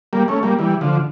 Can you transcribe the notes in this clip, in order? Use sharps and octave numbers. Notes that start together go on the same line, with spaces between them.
G3 A#3
A3 C#4
G3 A#3
E3 G3
D3 F3